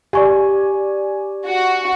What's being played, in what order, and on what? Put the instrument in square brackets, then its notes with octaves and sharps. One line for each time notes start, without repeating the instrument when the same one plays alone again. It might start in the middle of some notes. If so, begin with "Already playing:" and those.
[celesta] G4 C#6 [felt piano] D5 G#5
[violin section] F#4